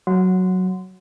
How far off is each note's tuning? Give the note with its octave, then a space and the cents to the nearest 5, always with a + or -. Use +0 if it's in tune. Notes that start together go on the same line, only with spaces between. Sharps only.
F#3 +0 F#5 -15 C6 -25